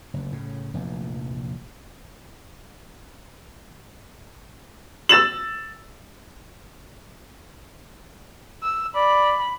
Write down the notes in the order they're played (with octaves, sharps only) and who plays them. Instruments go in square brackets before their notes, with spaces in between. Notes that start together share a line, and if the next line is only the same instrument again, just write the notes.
[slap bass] F#1 D2
A2 C#3
F1 A#1 E2
[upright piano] E6 A6 E7 F#7
[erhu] E6
[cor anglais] D5 [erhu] B5